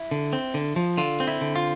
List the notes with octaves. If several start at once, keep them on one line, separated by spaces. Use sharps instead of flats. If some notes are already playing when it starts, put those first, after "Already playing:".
Already playing: E4
D3
C4
D3
F3
D3 F4
C4
E4
D3
F4